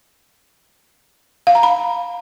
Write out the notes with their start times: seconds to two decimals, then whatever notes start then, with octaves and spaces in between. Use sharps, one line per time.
1.47 F5
1.55 A#5
1.63 B5